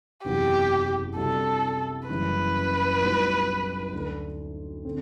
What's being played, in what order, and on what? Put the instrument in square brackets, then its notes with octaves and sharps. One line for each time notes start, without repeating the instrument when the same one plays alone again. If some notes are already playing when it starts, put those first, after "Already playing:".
[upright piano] F#1 E2 C3 F#3 B3 [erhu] G4
[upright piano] C2 C3 G3 D4 F#4 [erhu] A4
[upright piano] F#1 F#2 E3 G3 [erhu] B4
[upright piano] B1 A2 G3 D4 F#4
D2 D3 A3 D4
D3 A3 C4